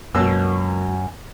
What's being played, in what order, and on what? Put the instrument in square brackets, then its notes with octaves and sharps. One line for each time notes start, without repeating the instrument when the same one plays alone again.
[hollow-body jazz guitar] C#2 F#3 A#3 [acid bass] F#2 [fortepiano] B2 E6